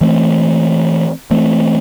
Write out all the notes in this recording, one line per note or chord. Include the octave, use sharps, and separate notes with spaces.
E3 A3 C4
E3 A3 C4